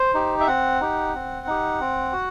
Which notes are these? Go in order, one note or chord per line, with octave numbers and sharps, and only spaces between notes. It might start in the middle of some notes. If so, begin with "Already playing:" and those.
Already playing: C5
D#4 G4
E5
C4 F#5
D#4 G4
C4
D#4 G4
C4
F#4